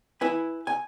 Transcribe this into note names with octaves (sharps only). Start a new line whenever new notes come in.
E4 B4 G#5
G#5